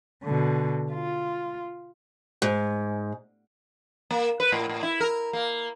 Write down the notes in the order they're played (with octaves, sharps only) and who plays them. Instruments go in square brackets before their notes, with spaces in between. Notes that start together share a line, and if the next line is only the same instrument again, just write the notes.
[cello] B2 D3
F4
[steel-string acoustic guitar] G#2
[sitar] A#3
B4
A2
A2
E4
A#4
A#3